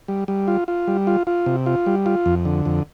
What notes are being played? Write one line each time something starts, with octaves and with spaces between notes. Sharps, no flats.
G3
G3
F4
F4
G3
F4
F4
C3
F4
G3
F4
F2
D3
F2